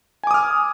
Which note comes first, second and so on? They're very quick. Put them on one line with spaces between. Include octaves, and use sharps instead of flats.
G#5 D6 D#6 F6